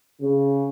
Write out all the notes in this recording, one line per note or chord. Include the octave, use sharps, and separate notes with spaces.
C#3